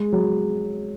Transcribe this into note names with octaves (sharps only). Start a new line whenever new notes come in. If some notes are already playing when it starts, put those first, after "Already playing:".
Already playing: G#3
F#3